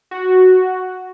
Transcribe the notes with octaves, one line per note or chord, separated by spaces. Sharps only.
F#4